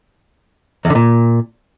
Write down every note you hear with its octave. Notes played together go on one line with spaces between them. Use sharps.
E2
D3
A#2